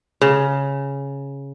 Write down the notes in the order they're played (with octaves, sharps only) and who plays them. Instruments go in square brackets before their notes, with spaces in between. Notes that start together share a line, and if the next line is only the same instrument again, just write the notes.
[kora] C#3